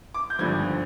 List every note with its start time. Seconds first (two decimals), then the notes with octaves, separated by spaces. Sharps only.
0.14 D6
0.30 G6
0.39 G#1 G2 D3 F3 G#6